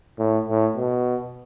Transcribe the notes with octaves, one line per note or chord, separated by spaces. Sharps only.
A2
A2
B2